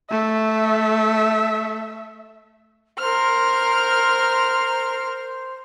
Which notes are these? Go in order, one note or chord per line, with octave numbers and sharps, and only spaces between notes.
A3 E5
A#4 C5 F6